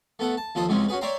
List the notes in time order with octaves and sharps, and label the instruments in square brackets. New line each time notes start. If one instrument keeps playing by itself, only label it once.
[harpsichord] A3 B3 A4 F#5
A5
D#2 F3 A4 C5 D#6
C#2 G#2 C3 E3 G#3 C#4
C#4 F#4 G#4 B4
C#5 D5 E5 G5 A#5 C6